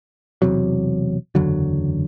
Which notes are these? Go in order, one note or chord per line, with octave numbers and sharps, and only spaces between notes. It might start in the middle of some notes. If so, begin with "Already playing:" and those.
E1 E2 C3 F#3
F#1 E2 D3 F#3